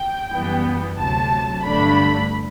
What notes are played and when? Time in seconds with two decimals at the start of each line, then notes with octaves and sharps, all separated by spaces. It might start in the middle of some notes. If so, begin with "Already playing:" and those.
Already playing: G5
0.32 F#2 E3 G3 B3
0.99 D2 C3 F#3 A5
1.65 G1 G2 D3 A3 D4 B5